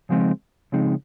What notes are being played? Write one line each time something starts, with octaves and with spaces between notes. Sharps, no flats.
C#3 F3 G#3 C4 D#4
C#3 F3 G#3 C4 D#4